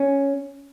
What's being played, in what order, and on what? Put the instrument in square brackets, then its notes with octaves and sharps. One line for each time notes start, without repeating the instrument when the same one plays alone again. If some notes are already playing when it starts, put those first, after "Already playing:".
Already playing: [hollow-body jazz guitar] C#4